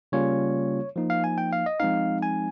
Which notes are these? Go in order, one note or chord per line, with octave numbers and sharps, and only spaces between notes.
C#3 G3 A#3 C#4 F4 C#5
F3 A#3 D#4
F5
G#5
G5
F5
D#5
F3 G#3 C4 D#4 F5
G#5